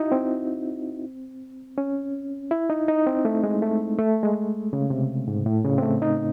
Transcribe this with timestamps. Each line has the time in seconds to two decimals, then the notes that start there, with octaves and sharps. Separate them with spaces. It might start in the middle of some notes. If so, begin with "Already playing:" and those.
Already playing: D#4 E4 F#4
0.12 C4
1.78 C#4
2.51 E4
2.70 D#4
2.88 D#4
3.07 C4
3.25 A3
3.44 G#3
3.62 A3
3.99 A3
4.23 G#3
4.73 C#3
4.90 C3
5.28 G#2
5.46 A2
5.65 C#3
5.78 C4
5.82 A3
6.02 D#4